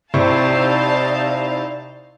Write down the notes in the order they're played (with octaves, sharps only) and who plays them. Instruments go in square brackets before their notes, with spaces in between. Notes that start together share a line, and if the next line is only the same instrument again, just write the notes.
[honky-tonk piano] C3 [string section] D#4 F5 A5 [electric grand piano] E4 C5 C#6 [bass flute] D5